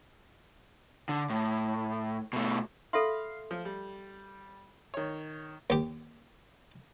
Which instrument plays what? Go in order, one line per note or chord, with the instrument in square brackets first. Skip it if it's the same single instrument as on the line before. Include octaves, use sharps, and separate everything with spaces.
[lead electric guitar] D3
A2
B2 A3
[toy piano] A4 E5 C6 [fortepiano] F5 B5
[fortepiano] F3
G3
D#3 C#5
[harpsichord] D#2 G4